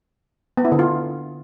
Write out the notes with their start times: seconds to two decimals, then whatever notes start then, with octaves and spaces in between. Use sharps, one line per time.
0.57 B3
0.65 E4
0.72 D3
0.79 F4